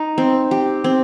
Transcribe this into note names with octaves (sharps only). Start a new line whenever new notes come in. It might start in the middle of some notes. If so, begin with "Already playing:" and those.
Already playing: D#4
C4
G4
C4